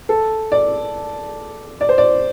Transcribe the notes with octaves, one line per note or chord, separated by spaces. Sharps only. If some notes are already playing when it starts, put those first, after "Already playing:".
A4
D5
D5
C5
D5